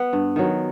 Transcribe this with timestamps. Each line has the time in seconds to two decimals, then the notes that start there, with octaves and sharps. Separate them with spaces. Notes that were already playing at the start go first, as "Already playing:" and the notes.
Already playing: B3
0.13 G2
0.36 D#3 F#3